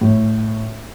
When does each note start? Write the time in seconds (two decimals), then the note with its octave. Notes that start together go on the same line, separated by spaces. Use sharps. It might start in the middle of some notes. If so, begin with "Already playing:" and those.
0.01 A2